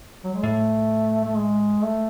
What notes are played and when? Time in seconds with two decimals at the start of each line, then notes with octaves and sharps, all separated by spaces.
0.24 F#3
0.34 G#3
0.43 A2 A3
1.25 A3
1.36 G#3
1.82 A3